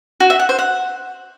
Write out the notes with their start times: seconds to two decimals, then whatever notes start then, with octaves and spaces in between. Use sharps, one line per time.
0.20 F#4
0.30 E5
0.39 F#5
0.49 C5
0.59 F#5